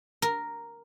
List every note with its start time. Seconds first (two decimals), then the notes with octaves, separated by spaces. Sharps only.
0.22 A#4